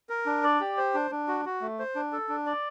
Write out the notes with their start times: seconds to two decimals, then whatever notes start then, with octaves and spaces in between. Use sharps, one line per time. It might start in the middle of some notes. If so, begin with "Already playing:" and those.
0.09 A#4
0.26 D4
0.44 D5
0.61 G4
0.77 C5
0.94 D4
1.11 D4
1.28 F#4
1.45 F#4
1.61 A3
1.79 C5
1.95 D4
2.13 A4
2.29 D4
2.46 D5